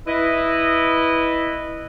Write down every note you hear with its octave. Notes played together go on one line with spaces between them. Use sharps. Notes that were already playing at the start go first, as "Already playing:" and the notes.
E4 B4 D#5